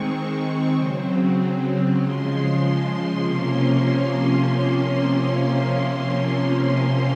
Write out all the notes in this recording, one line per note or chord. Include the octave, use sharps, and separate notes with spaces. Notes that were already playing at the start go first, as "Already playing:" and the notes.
Already playing: D#3 G#3 C4 C#6
C#3 F#3 C4
C#3 F3 G#3 C6
C3 F3 A#3 C#4 C6